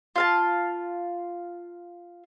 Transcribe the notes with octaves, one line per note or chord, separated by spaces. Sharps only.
F4 F5 A5